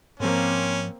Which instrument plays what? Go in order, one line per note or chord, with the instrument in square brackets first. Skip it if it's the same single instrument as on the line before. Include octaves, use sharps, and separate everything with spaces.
[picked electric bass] G#2 F3 [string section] A#3 C4 [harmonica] C#4